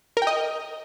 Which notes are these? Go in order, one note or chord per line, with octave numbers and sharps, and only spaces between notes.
A#4
G5
D#5